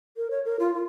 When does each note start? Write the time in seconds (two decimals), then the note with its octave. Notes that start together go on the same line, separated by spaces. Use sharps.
0.17 A#4
0.31 C#5
0.45 A#4
0.60 F4
0.74 F4